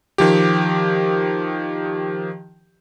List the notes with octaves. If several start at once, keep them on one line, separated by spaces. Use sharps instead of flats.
D#3 F3 G4